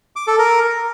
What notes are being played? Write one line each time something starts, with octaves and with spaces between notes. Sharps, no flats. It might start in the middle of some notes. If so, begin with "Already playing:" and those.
D6
A4
A#4